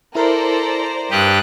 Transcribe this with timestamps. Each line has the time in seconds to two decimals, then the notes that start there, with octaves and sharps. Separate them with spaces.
0.15 E4 A4 A#4 C5 D5 A#5
1.11 G2 G4 D#6 F#6